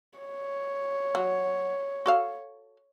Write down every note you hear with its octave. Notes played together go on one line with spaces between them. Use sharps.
C#5
F#3
F#4 A4 F5